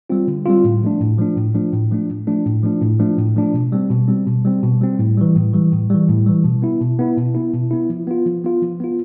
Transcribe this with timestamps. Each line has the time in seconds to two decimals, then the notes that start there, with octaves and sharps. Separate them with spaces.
0.10 G3 C4 F4
0.27 D3
0.46 G3 C4 F4
0.64 A2
0.82 F3 A3 D4
1.00 A2
1.19 F3 A3 D4
1.36 A2
1.54 F3 A3 D4
1.73 A2
1.91 F3 A3 D4
2.09 A2
2.27 F3 A3 D4
2.45 A2
2.63 F3 A3 D4
2.82 A2
2.99 F3 A3 D4
3.18 A2
3.36 F3 A3 D4
3.54 B2
3.72 G3 C4
3.91 B2
4.08 G3 C4
4.27 B2
4.45 G3 C4
4.63 B2
4.81 G3 C4
4.99 A2
5.17 E3 G3
5.35 A2
5.53 E3 G3
5.72 A2
5.90 E3 G3
6.08 A2
6.26 E3 G3
6.44 B2
6.62 B3 E4
6.80 B2
6.99 B3 E4
7.17 B2
7.35 B3 E4
7.54 B2
7.71 B3 E4
7.90 F3
8.07 B3 F4
8.26 F3
8.44 B3 F4
8.62 F3
8.80 B3 F4